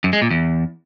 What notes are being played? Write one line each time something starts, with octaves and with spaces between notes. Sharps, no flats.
F#2
G#3
A#2
E2